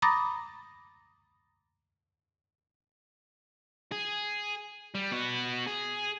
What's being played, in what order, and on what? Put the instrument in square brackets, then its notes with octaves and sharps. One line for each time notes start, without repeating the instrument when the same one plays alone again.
[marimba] A#5 B5 D6 D#6 A6 A#6
[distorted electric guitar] G#4
G3
B3 F#4
G#4